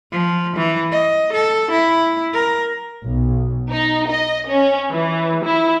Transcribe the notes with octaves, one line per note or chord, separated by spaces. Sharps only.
F3
E3
D#5
A4
E4
A#4
B1
D#4
D#5
C#4
E3
E4